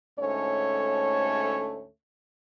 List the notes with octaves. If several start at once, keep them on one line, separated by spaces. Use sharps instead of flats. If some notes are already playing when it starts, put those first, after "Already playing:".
D2 G#2 A3 C#4 A4 C#5